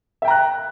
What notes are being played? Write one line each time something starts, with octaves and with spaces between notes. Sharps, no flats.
E5 G5 A#5 F#6